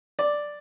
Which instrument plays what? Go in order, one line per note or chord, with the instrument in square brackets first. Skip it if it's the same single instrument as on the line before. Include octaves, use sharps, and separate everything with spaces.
[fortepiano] D5